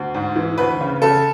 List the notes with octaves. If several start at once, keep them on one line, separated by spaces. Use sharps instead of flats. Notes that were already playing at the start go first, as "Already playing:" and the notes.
Already playing: D2
G#2
E3
D2 B4
C#3
C#3 A4